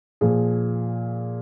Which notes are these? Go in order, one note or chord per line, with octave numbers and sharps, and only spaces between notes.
A#2 F3 G#4